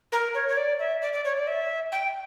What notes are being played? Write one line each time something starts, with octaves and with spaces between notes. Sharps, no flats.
A#4
C#5
C#5
D5
E5
D5
D5
C#5
D5
E5
G5